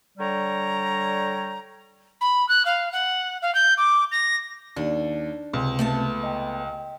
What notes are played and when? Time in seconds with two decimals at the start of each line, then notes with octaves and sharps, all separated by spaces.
0.18 D3 G3 C#5 G5 A#5
2.21 B5
2.49 F#6
2.65 F5
2.92 F#5
3.42 F5
3.55 G6
3.78 D6
4.12 A#6
4.76 D#2 D4
5.53 C#2 C3 C4
5.79 A3 B3 A5
6.23 D#5 G5